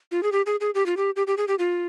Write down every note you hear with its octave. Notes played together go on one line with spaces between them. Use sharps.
F4
G#4
G4
G#4
G#4
G4
F4
G4
G4
G4
G#4
G4
F4